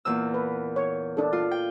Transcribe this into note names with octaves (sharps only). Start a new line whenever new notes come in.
E2 A#2 E6
B4
C#5
D4 A4
F4
G5